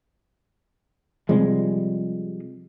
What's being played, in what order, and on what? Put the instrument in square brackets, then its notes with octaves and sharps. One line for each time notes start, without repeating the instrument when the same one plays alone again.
[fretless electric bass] C3 F3 G3 G#3